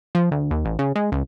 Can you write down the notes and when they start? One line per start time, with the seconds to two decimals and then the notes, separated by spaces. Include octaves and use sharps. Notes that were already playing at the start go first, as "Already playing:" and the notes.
0.15 F3
0.31 D2
0.51 D#2
0.65 A1
0.79 C#3
0.96 G#3
1.12 C#2